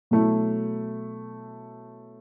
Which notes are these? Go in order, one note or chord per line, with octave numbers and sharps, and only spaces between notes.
B2 F#3 A3 E4